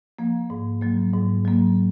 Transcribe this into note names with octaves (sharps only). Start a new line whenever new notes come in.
F3 A#3
G#2
F#3 A#3
G#2
F#3 A#3